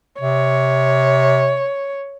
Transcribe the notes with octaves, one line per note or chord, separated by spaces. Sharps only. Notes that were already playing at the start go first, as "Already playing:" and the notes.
C3 C#5